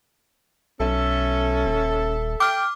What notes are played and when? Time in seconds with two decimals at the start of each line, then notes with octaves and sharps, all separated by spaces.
0.80 B1 C#4 A4 E5
1.66 D#1
2.40 G5 D6 F6